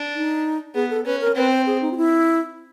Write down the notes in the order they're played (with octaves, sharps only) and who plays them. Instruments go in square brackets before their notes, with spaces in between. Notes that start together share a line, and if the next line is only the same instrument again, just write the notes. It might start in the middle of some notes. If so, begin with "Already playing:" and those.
Already playing: [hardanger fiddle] D4
[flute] D#4
[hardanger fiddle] B3 [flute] G#4
[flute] A4
[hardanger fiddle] C#4 [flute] B4
[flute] A#4
[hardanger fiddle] C4 [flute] B4
[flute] C5
G#4
D#4
F4
E4